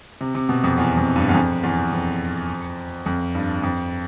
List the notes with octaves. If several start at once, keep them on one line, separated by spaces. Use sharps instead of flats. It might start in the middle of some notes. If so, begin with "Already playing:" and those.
C3
C3
B2
F2
E2
F2
G2
E2
F2
E2
F2
F2
G2
F2